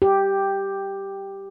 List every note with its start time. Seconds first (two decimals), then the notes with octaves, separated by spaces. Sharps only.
0.02 G4